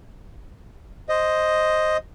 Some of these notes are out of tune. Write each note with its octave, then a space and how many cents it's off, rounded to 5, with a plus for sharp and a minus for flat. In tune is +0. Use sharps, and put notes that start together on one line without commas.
C5 +0 D#5 +0